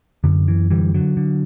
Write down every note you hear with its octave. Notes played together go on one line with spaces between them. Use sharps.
F#2 D3
E3
D3 E3 G3
D3 F#3
D3